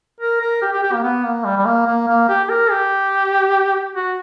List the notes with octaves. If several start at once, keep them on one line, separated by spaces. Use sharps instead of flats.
A#4
A#4
G4
G4
G4
A#3
B3
A#3
G3
G3
A#3
A#3
A#3
G4
G4
A#4
G4
F#4